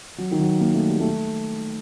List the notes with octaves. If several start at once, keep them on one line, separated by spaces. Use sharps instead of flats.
F#3
D#3
F#3
A#3
A3
G3
A3